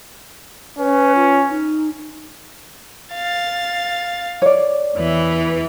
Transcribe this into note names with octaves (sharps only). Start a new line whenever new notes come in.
C#4 B4
F4
D#4
F5 A6
C#5 D5
E2 E3 B4